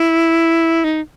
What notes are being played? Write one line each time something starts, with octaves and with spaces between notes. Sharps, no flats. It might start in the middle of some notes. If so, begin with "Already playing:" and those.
Already playing: E4
D#4